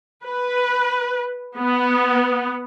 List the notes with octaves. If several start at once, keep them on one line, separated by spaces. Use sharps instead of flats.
B4
B3